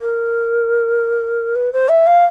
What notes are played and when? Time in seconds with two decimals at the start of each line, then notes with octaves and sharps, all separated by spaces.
0.01 A#4
1.55 B4
1.72 C5
1.88 E5
2.06 F5